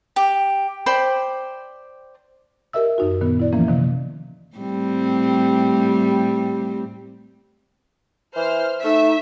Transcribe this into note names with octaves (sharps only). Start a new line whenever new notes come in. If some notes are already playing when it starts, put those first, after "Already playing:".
G4
C5 D5 G5 B5
G4 A#4 D#5 E5 E6
F#2 D#4 F#4
A#2 D#3 B3
E4 D5
E3 F3 A#3 C#4
C3 D#3 F3
A2 G3 C4
E3 C5 F6
A3 D#4 E5